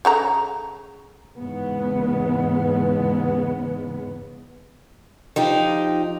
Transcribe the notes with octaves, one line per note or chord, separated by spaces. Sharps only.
C#3 A4 A#5
E2 G#2 C#3 G#3 B3
F3 D#4 G4